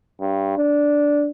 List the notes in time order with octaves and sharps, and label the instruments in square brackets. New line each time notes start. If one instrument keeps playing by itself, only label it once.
[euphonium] G2
D4